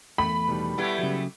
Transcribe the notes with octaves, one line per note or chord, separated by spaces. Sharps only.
E2 A3 B5
B2 D#3 G3
G3 A3 B3 E4 G4 F#5
C#3 F#3